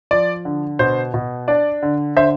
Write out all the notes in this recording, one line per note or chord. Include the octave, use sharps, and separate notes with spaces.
F3 D5
D3
B2 C5
B2
D4 D5
D3
D3 C5 E5